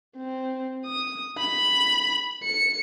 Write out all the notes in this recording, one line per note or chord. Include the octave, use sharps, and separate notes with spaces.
C4
D#6
B5
C#7